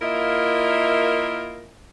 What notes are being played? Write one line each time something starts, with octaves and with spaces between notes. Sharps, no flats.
A#3 E4 F4 A#4 D#5 E5